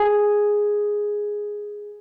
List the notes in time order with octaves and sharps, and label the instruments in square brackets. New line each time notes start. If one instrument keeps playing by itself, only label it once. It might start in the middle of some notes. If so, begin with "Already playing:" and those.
Already playing: [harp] G#4